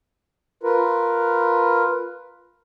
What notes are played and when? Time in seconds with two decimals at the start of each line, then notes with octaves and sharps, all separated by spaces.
0.63 F4 A#4 B4